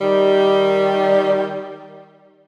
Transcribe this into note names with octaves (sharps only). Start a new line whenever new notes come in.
D#3 G3